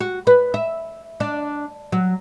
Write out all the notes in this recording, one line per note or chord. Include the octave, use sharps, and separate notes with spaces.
F#4
B4
E5
D4
F#3